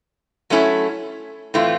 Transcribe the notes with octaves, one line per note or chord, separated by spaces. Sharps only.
F#3 A3 C#4 E4 A4
A2 E3 A3 C4 F4